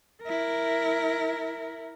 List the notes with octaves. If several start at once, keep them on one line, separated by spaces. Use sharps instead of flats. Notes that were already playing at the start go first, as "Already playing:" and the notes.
E4 A#4